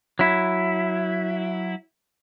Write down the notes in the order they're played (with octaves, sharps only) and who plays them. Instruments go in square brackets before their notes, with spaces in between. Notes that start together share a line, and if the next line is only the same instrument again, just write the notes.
[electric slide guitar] F#3 E4